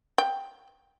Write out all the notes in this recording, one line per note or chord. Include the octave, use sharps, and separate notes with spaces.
G5